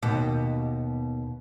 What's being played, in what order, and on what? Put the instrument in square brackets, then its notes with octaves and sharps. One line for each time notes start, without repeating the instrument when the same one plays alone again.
[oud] D#2 B2